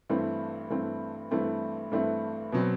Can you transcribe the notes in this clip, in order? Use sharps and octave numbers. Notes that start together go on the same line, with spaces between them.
G2 E3 A3 C4
G2 E3 A3 C4
G2 E3 A3 C4
G2 E3 A3 C4
B2 F#3 C4